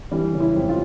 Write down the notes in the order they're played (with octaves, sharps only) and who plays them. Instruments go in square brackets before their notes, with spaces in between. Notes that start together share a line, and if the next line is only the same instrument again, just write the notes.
[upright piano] E3 G3
C#3
E4
F2
F4